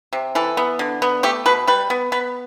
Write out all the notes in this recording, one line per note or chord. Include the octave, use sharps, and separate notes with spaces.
C3
E3 A4
B3
D3
B3
A3 G4
B2 B4
G3 B4
B3
B3 B4